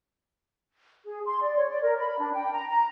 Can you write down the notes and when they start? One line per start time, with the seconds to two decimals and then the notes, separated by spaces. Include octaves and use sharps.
1.05 G#4
1.25 C6
1.42 D5
1.56 C#5
1.70 D5
1.83 A#4
2.00 B5
2.19 D4
2.34 G5
2.53 A#5
2.69 A#5